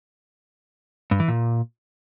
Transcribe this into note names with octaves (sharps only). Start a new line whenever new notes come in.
G2
E3
A#2